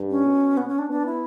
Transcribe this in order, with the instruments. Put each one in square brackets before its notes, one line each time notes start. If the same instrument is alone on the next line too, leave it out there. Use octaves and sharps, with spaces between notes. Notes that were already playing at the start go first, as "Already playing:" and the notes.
Already playing: [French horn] G2
[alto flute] C#4
[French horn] B2
[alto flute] B3
C#4
D4
[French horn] B3 [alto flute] D4
[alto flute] E4